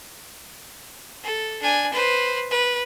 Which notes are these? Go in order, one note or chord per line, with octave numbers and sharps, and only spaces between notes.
A4
D4 G#5
B4 C5
B4